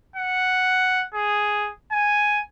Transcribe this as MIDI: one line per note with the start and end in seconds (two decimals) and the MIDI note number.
0.16 1.05 78
1.14 1.70 68
1.92 2.42 80